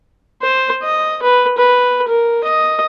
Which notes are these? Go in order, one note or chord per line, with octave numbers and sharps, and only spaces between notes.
C5
D#5
B4
B4
A#4
D#5